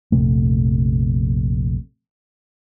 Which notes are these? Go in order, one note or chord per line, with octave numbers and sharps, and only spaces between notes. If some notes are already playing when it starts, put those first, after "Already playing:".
A#1 F2 C3 A3